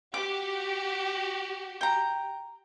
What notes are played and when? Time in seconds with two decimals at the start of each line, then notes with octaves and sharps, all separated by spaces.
0.14 F#4 G4 D6
1.81 G5 A#5